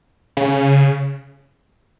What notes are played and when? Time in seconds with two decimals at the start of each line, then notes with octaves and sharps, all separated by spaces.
0.37 C#3